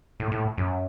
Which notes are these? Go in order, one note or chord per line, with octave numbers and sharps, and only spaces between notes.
A2
A2
F#2